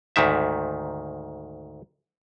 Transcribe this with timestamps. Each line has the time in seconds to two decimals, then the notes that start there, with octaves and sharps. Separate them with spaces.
0.16 D2 G#2 D#3 E5